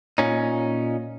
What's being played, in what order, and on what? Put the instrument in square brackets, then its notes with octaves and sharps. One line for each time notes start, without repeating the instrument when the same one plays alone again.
[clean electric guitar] A#2 C#4 D#4